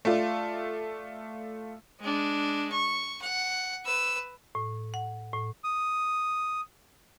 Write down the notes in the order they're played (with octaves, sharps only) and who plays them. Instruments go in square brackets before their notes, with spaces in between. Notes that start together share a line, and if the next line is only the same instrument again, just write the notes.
[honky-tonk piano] A3 F4 D5
[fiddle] G#3 D4
C#6
F#5
B4 E6
[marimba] A2
F#5
A2
[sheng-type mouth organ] D#6